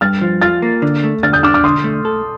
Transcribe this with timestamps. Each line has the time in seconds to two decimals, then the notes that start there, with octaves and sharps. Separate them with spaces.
0.01 G2 F6 A6
0.21 F3
0.41 F4 F6 A6
0.62 A#3
0.82 D3
1.04 A3
1.23 D3 F6 A6
1.33 D#6 G6
1.43 D4 D6 F6
1.54 D6 F6
1.64 D3 C6 D#6
1.84 A3
2.05 A4